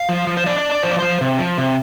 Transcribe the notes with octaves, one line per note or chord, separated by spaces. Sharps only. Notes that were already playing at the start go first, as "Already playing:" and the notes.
Already playing: F5
F3
F3
C5
D4 D5
D5
D4
D5
F3 C5
D5
F3 C5
C3
F3
C3